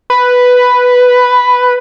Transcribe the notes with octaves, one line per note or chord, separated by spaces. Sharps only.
B4